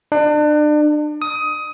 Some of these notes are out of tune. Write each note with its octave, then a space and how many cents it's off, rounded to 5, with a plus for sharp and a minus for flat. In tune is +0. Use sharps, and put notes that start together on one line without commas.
D4 +35
D#6 +20